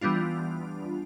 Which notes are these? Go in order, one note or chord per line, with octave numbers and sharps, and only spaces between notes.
E3 G3 B3 D4 F4